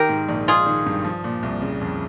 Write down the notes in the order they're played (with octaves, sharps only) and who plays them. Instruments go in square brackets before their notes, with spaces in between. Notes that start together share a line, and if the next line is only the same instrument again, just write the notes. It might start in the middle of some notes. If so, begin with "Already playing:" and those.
Already playing: [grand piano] D#3 [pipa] G4 A#4
[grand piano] G#2
A#1
[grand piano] G#3 [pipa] F4 G#4
[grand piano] D#3
G2
F3
A#2
C2
C#3
F2